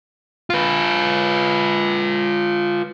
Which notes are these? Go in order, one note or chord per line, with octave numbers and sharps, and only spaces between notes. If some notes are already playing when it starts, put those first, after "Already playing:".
F4 B4